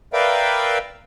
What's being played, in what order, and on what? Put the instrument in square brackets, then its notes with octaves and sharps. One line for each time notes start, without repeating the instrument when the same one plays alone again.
[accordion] A#4 B4 D5 E5 F5 G5